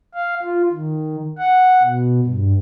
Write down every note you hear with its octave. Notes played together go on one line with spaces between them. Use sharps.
F5
F4
D#3
F#5
B2
G2